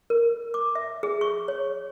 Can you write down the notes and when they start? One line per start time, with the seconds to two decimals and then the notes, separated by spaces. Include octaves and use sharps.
0.10 A#4
0.54 D6
0.75 E5
1.03 G#4
1.21 C#6
1.48 C#5